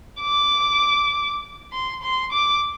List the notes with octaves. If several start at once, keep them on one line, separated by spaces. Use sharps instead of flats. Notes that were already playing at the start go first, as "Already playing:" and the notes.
D6
C6
C6
D6